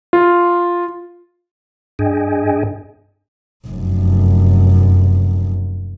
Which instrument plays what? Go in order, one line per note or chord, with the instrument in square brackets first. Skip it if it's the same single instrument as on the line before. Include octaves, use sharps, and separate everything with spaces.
[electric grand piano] F4
[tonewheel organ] G2 D4 G#4 D#5 G5 G#5
[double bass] F1 F#2